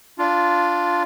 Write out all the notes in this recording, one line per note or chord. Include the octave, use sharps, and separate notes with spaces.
D4 F4